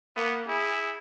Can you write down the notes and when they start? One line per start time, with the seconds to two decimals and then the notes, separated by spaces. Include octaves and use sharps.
0.16 A#3 B3
0.48 E4 G#4